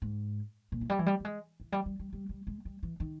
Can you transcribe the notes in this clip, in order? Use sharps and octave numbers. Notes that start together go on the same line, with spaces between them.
G#2
A#2
E3
G3
E3
G3
G3
G#3
E3
G3
G3
G3
G3
G3
G#3
G3
E3
D#3